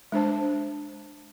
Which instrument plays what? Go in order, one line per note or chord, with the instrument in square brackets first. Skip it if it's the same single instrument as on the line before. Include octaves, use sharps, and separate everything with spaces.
[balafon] G#3 D4 C5 A5